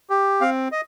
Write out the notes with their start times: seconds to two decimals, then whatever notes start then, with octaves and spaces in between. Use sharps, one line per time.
0.10 G4
0.41 C4 F5
0.72 D#5